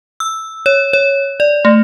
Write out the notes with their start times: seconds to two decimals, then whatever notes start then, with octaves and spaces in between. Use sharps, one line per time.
0.20 E6
0.66 C#5
0.93 C#5
1.40 D5
1.65 A3